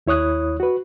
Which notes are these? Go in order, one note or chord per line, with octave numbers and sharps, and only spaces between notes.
D#2 E4 C#5 D#6 F#6
F#4 B4